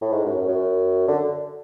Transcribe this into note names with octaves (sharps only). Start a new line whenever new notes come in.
A2
G#2
F#2
F#2
F#2
D3